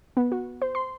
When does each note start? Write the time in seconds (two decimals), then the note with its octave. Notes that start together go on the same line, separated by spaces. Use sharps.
0.17 B3
0.32 F#4
0.62 C5
0.75 C6